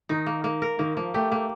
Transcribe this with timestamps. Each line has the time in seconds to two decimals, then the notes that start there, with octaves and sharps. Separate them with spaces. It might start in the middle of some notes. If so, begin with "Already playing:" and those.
0.09 D#3 D#4
0.26 A#3
0.44 A#3
0.62 A#4
0.79 D#3 A#3
0.97 F3 A#3
1.14 A3 G4
1.31 A3 A#3